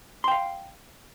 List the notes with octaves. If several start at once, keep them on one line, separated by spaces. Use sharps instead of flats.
F5 G5 C6